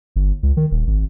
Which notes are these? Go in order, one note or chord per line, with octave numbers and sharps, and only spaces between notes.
G1
C#2
D#3
D#1
G#1